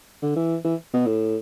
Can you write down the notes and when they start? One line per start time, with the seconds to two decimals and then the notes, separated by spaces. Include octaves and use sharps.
0.22 D3
0.36 E3
0.65 E3
0.93 B2
1.06 A2